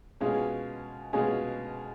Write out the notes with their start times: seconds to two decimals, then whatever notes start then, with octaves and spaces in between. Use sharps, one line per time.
0.20 B2 G#3 C#4 F4 G#4
1.13 B2 G#3 C#4 F4 G#4